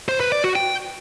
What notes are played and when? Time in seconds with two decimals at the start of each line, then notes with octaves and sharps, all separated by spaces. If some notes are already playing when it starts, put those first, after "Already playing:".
0.09 C5
0.20 B4
0.32 D5
0.44 F#4
0.56 G5